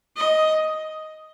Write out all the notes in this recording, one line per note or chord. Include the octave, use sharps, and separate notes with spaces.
D#5